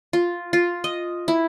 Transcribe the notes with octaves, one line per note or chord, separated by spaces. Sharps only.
F4
F4
D#5
E4